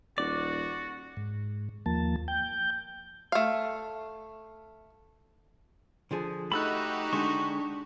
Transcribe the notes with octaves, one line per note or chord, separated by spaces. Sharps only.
D#1 F#4 D5
G#2
D#2 F3 A#3 A5
G5 G6
A3 F5
D3 F3 G#4
A3 D#4 F#4 G4 D#5 B5 E6 F#6
D3 G#3 D4 C#6